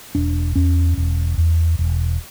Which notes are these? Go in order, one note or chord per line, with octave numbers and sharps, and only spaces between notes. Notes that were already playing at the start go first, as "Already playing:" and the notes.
E1 D4
E2 C#4
E1
E2
E1